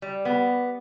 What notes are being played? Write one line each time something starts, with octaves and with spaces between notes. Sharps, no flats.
G3
B3